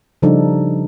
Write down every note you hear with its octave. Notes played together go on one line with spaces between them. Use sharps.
C#3 F3 G3 D4 D#4 A4